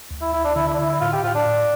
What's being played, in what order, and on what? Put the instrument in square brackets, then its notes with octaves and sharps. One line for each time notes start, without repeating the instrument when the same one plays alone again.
[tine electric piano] D2
[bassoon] E4
[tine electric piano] D2 [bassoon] E4
[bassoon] D4
[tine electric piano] D3 [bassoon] E4
[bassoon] E4
D4
[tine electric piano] D3 [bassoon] E4
[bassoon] E4
[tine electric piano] A2 [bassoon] F4
[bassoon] G4
[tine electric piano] A2 [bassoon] F4
[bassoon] D4
[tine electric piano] A2